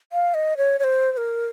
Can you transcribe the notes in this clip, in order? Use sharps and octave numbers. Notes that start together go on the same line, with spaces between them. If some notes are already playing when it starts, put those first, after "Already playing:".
F5
D#5
C#5
C#5
C5
C5
A#4